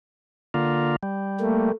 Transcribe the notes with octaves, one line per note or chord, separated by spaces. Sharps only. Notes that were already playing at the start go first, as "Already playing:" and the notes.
D3 A#3 F4
G3
A3 A#3